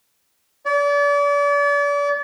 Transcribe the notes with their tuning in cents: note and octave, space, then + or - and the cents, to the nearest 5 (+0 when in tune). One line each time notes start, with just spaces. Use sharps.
D5 -40